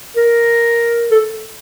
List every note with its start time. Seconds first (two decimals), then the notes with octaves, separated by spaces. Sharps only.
0.17 A#4
1.11 A4